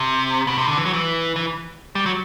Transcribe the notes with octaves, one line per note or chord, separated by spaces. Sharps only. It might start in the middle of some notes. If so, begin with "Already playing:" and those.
Already playing: C3
B2
C3
D3
E3
F#3
E3
E3
G3
F#3